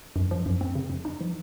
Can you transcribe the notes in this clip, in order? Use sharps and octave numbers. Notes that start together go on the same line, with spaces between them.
F#2
F3
F#2
C4
C#3
F2
D#4
F3